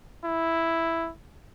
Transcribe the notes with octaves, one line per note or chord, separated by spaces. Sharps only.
E4